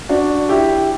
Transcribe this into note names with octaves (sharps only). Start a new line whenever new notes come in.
D4 F#4
E4 G4